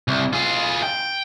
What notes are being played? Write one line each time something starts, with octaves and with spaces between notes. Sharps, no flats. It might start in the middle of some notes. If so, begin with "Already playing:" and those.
C2
F4 G#4
G5